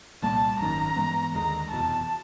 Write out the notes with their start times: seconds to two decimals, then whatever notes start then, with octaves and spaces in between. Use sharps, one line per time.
0.22 C2 A#2 G3 A#3 A5
0.59 G#1 F#2 D#3 A#5
0.96 G2 E3 G#3 B3
1.34 D#2 D3 F3 G#3 A#5
1.71 F1 E2 B2 A5